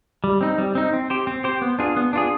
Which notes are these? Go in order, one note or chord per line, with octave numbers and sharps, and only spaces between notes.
G3
C4 D#4
G3
C4 D#4
C4
G4 C5
C4
G4 C5
B3
D4 F4 G#4
B3
D4 F4 G#4